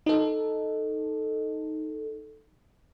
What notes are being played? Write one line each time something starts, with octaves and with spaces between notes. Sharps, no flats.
D#4 A4